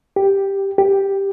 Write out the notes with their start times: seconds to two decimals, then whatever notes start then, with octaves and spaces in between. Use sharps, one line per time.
0.16 G4
0.78 G4